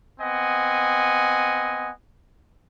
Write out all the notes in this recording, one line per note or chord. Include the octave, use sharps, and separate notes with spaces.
B3 C4 D#5 F#5 G#5